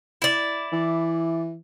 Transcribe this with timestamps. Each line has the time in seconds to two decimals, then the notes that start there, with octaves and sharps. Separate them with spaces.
0.22 E4 D5
0.72 E3